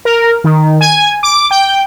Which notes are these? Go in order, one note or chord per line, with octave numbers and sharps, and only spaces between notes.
A#4
D#3
G#5
D6
G5